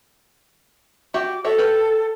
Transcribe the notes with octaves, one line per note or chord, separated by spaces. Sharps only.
F#4 G4 E5 D6
F#4 A4 C#5 E5
G4 A#4 B4